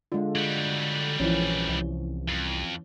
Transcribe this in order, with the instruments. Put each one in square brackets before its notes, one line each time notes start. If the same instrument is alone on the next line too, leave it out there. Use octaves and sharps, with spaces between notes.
[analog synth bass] D3 [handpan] G#3 F4
[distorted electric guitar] F#3 G3
[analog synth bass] A#1 [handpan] E3 F3 C#4
[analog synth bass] C2
[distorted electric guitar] F2